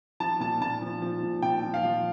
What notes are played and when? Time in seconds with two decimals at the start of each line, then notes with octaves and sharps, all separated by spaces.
0.20 F3 A5
0.40 A#2 A5
0.61 A#2 A5
0.82 F3
1.02 F3
1.23 A#2
1.42 A#2 G5
1.64 F3
1.74 F5
1.84 F3